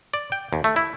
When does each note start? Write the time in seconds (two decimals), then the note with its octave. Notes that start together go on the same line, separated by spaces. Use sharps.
0.14 D5
0.32 G5
0.53 D#2
0.64 A3
0.76 E4